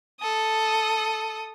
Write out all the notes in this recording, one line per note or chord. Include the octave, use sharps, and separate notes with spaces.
A4 D#6